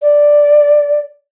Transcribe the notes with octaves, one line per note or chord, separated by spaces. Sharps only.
D5